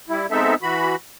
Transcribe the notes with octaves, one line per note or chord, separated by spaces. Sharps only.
G3 E4
G#3 B3 C4 D#4 A4 E5
E3 F#4 B5